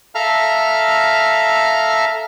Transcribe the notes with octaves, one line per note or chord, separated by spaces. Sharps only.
A4 E5 F5 A#5 F6